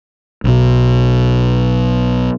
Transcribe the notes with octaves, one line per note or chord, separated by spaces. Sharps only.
B1 B2